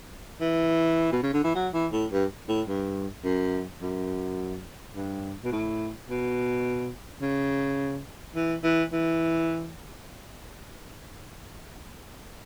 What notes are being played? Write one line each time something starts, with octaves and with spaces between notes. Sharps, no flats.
E3
B2
C#3
D3
E3
F#3
E3
A2
G2
A2
G2
F#2
F#2
G2
B2
A2
B2
C#3
E3
E3
E3